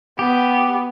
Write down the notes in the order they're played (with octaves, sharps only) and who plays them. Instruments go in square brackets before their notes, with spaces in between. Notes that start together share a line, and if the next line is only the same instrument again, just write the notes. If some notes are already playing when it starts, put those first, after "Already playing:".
[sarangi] B3 [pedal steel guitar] G4